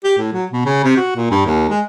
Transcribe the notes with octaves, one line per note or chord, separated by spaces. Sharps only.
G4
A2
F#3
B2
C#3
C3
F#4
A#2
G2
D#2
G#3